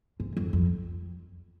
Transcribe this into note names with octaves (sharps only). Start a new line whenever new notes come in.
G#2
F2
F2